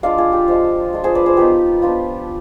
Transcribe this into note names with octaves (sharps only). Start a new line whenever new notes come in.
G#3 D4 F4 D5 F5
F4 G#4
G4
F3 G#3 D4
G#3 D4 F4
G#4 C5
B4 D5
G#4 C5
F3 B3 D#4 G4 B4
F3 B3 D4 F4